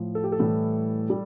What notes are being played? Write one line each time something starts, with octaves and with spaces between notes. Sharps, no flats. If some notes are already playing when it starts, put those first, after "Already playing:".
Already playing: A2 F3
A4
G4
A4
A2 E3 G3
G3